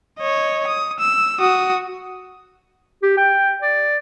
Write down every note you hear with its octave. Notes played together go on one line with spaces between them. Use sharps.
C#5 D#5
D#6
E6
F#4 D#6
G4
G5
D5